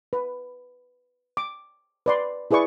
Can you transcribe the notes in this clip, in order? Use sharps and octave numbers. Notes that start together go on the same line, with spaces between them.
B4
D6
B4 D5 C6
E4 G#4 B4 D5 C#6